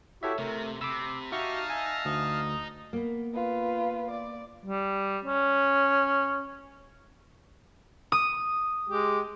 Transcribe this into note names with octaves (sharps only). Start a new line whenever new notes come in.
E4 F#4 G4 A4 C#5 E5
C3 A3 A#4
C3 B5 C6 D6 E6
D#4 F#4 G4 E5 F5 A5 C#6 F6
E5 G#5
D2 D#6
A#3 B3
F4 B4
D5
G3
C#4
D#6
G#3 G4